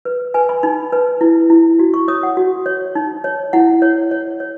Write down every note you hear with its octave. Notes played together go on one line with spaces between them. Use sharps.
B4
B4 G#5
B5
D#4 B5
B4
E4
E4
F#4
C#6
C#5 D#6
F#5
F#4
C#5
D#4
C#5
E4 F#5
C#5
C#5
C#5